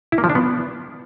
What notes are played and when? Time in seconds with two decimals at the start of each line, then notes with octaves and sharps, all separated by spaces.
0.12 E4
0.18 A#3
0.24 F3
0.30 D4
0.35 B3